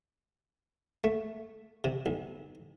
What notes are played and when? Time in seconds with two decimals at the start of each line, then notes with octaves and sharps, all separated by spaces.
1.04 A3
1.84 C3
2.06 B1